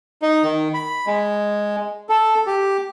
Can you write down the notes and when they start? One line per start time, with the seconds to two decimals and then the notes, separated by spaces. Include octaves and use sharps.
0.22 D#4
0.43 D#3
0.74 B5
1.07 G#3
2.09 A4
2.47 G4